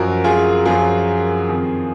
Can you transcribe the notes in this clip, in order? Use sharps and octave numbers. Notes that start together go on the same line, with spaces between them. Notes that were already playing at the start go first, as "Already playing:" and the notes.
Already playing: F#2 F3 F#4 A#4
F4 G#4
F#2 F3 F4 G#4
F2 D#3